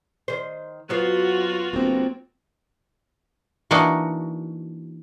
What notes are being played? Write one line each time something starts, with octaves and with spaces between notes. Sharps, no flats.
D#3 C5
F#2 F#3 B3 F4 F#4 C5
G1 A#3 C4
E3 A#3 D4 D#4 F#4